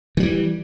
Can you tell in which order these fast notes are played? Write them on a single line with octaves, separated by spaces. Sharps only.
D#3 F#3 E3 G3